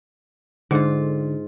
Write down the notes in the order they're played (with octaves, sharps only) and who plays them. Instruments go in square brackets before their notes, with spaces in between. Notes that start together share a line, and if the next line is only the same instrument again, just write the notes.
[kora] G#2 F4 [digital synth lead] D3